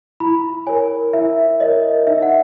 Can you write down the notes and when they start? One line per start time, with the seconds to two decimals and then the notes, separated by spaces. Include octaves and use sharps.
0.20 E4 B5
0.67 A#4 C#5 G#5
1.13 E4 E5
1.60 A#4 C#5 D#5
2.07 D#4 E5
2.22 F#5